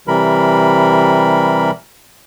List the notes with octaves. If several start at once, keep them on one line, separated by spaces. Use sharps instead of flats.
C3 E3 G3 A#4 B5